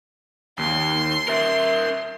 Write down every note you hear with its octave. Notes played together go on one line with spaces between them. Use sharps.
D#2 C6
A#4 E5